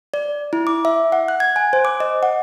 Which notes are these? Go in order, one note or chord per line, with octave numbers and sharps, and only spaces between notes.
D5
E4
D6
E5
F#5
F#6
G#6
G#5
C5
D6
D#5
F#5